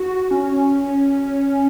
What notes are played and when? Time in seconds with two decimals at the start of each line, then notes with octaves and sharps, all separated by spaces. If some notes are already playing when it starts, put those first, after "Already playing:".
Already playing: F#4
0.31 C#4